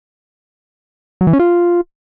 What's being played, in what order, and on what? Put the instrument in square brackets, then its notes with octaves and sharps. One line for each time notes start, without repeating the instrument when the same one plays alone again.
[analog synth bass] F#3
E3
C#4
F4